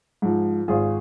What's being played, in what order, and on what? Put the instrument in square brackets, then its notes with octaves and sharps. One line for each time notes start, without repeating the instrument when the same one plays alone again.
[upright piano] G#2 F3
G#1 F4 G#4